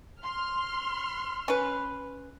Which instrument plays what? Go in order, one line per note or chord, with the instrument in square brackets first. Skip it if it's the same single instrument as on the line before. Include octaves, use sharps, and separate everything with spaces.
[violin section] C6 F6
[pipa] C#4 B4